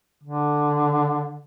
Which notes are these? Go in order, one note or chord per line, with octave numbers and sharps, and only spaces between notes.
D3